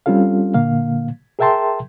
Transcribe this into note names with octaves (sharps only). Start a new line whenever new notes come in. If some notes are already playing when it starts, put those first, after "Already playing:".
G3 C4 C#4 F4 A4 F5
A#2 D3 A#3 F5
G#4 A#4 E5 G5 A5 C6